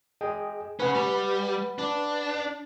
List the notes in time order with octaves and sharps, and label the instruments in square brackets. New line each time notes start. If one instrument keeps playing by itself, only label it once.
[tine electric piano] G#4 D#5 G5
[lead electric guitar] C#4 G#4 [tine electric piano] B4 F#5 B5
[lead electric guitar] G3
D4